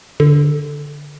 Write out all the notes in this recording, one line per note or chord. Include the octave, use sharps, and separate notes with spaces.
D3